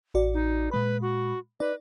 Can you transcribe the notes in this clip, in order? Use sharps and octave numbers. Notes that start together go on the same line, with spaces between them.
A1 F#4 D5
D#4
A#2 G#3 B4 B5
F#4
D#4 B4 D5